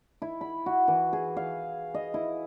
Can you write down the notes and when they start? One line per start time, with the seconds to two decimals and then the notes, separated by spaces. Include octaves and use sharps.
0.22 E4
0.41 B5
0.66 F#4
0.88 E3
1.13 G#4
1.37 F5
1.94 D#5
2.14 E4